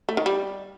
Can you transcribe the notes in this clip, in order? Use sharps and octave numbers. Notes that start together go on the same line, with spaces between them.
A3
D#3
G3